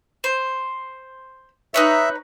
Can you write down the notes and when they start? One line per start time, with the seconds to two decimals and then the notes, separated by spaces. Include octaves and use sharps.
0.24 C5
1.74 D#4 B4 C#5 E5